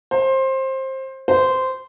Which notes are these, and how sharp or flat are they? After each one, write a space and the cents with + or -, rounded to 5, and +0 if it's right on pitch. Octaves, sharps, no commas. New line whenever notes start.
C5 +20
C5 -15